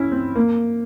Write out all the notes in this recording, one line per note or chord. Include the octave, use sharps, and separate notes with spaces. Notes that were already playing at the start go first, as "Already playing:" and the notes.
Already playing: C#4 E4
C4
A#3